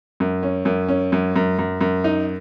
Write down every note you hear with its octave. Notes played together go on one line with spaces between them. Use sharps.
F#2
C#4
F#2
C#4
F#2
F#2
F#2
F#2
D#4